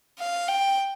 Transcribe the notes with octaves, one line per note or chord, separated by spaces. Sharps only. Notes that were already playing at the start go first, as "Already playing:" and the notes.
F5
G5